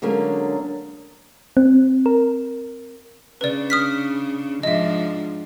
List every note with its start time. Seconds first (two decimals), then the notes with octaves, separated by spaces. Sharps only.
0.02 D3 F#3 G#3 A#3 C#4 D4
1.57 C4
2.06 A#4
3.41 C#3 D4 B4 D5
3.70 D#6 F6 B6
4.63 G#2 F3 D4 D#5 E5